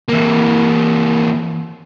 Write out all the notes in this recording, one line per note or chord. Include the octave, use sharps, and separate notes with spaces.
E3 A#3